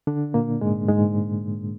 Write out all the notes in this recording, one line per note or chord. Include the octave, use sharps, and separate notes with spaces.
D3 D4
A#2 A#3
G#2 G#3
G#2 G#3